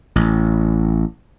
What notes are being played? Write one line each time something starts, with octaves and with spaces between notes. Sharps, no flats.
A1